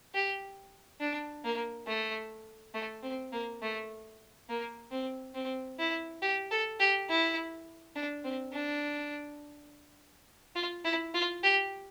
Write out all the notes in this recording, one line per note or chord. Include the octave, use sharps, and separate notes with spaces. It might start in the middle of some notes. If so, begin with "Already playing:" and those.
G4
D4
A#3
A3
A3
C4
A#3
A3
A#3
C4
C4
E4
G4
A4
G4
E4
D4
C4
D4
F4
E4
F4
G4